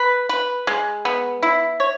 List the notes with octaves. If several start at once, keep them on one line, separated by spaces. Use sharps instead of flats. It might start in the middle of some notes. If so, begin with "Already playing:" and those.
Already playing: B4
B4
G#3
B3
E4
C#5